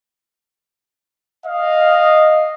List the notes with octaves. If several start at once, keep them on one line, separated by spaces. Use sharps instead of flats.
D#5 F5